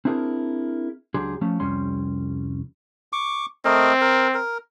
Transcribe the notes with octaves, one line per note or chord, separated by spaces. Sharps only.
C4 D4 E4 G#4 A#4
C#2 F#3 D4 G4 G#4 C6
F3 A3 C#4
C2 F2 G3 C#4 C6
C#6 D6
A3 C4 A#4 D#5
A#4
A#4